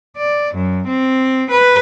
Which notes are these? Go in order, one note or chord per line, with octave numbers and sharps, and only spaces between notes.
D5
F#2
C4
B4